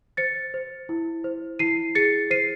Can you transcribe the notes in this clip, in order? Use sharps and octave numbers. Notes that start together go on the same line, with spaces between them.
C5 A6 C#7
C5
E4
C5
E4 C7 D#7
G#4 A6 C#7
C5 C7 D#7